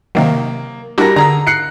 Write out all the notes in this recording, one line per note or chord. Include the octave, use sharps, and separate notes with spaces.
C3 D#3 F#3 A#3
G3 D4 E4 F#4 A#4 A#6
D3 G#4 A#5 E6
F#6 C7 C#7